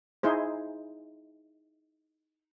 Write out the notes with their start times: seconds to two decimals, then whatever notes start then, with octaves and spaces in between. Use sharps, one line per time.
0.23 D#4 E4 G#4 C5